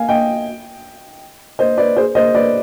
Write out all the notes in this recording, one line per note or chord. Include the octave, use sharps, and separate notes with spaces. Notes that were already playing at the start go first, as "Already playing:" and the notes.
Already playing: F5 G#5
D#5 G5
C5 D#5
B4 D5
G#4 C5
C5 D#5
B4 D5